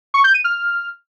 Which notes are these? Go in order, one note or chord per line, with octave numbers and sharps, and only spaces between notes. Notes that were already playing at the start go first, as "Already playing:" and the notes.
C#6
G6
D#7
F6